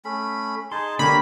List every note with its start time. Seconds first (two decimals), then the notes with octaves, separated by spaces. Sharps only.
0.05 A3 C#4 B5
0.72 D#4 G#4 A5 C6
0.99 D3 A#3 G4 A#4 C#5 B5